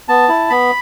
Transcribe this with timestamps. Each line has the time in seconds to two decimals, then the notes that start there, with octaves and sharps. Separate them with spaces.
0.08 B3 A5
0.29 E4
0.50 B3 B5